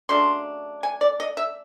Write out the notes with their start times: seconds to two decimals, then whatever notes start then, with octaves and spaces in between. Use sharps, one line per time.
0.09 C#3 F#3 A3 D4 C6
0.83 G#5
1.01 D5
1.20 D#5
1.37 E5